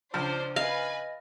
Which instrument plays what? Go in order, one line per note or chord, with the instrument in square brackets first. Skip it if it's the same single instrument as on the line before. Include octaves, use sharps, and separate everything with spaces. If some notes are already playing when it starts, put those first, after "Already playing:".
[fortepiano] C#2 F3 [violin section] C#4 D4 C5
[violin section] B4 G#5 [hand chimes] D#5 A#6 [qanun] F5